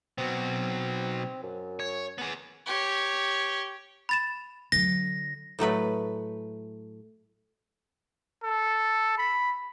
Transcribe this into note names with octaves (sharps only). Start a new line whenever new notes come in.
B2 F#3 C4
F#2
C#5
B3 G#4
G4 C#5
B5 A6 E7
D3 F#3 A#6
A2 F#3 A3 B4
A4
B5